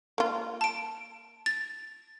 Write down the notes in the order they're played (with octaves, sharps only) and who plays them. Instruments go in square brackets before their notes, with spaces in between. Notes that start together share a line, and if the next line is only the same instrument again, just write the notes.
[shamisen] A#3 F4
[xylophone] A5 D7
A6